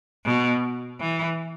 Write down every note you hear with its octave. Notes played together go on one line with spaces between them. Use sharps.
B2
E3